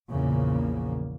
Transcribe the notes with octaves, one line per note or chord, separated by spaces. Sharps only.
A#1 E2 A#2 C#3 F3 A#3